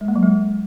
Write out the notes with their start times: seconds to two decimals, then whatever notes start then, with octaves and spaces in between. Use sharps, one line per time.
0.01 G#3
0.08 A#3
0.16 F#3
0.23 G#3